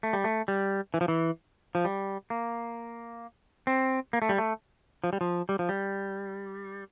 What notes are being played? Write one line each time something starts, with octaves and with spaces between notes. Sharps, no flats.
A3
G3
A3
G3
E3
F3
E3
F3
G3
A#3
C4
A#3
A3
G3
A3
F3
G3
F3
G3
F3
G3